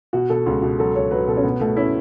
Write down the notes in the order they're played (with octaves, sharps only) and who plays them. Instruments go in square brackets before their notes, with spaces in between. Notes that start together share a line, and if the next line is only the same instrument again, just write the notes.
[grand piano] B2 [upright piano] F#4
[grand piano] B2 [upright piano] A4
[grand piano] C#2 [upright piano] F#4
[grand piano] B2 [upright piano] F#4
[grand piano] F#3 [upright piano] A4
[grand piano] C#2 [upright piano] C#5
[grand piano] F#3 [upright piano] B4
[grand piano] B2 [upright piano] A4
[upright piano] C#4
[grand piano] B2 [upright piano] B3
[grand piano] B2 [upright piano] A3
[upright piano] C#4 [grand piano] E4